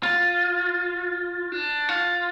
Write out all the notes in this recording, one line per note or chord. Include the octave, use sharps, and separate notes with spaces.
F4
D4
F4